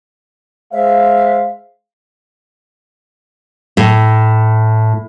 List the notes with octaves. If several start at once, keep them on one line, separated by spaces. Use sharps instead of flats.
G#3 C5 E5 F5
A2